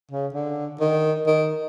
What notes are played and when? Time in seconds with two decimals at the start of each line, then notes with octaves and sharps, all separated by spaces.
0.11 C#3
0.34 D3
0.80 D#3
1.27 D#3